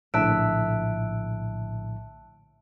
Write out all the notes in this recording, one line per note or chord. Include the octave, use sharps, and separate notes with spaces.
A#1 A2 D3 E5 A5 F#6 D7